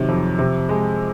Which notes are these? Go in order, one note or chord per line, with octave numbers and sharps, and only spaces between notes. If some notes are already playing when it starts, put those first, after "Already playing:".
Already playing: C3 D#3 F#3
F2
C3
G#3